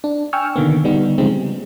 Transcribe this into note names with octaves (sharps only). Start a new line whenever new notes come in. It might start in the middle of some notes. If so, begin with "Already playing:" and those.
D4
G5 G#5 C#6 E6 F6
B2 D3 D#3 A#3 B3
D3 G3 B3 D#4
C#3 F3 G3 G#3 C4 D#4
G3